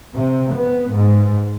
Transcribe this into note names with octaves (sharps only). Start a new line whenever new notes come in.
C3
B3
G#2